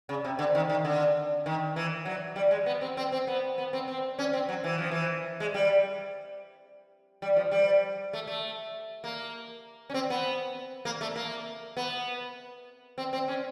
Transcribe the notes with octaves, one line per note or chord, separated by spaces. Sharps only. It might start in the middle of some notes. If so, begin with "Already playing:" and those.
C#3
C3
D3
D#3
D#3
D3
D#3
E3
F#3
G3
G#3
B3
C4
C4
C4
B3
B3
C4
C4
C#4
C4
F#3
E3
F3
E3
G#3
G3
G3
F3
G3
A3
A3
A#3
C#4
C4
B3
A#3
A3
A#3
B3
C4
C4
C#4